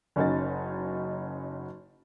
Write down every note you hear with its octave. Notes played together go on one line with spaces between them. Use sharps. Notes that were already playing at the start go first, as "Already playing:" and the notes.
F#1 C#4 D#4 F#4 A6